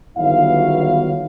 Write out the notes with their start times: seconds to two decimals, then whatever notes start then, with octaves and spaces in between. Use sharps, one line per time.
0.18 G1 E2 D#3 F#3 E4 F5